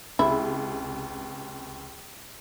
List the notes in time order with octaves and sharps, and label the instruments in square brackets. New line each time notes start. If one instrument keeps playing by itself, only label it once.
[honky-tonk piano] C#2 C3 [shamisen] E4